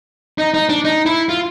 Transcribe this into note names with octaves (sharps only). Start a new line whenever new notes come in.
D#4
D#4
D4
D#4
E4
F4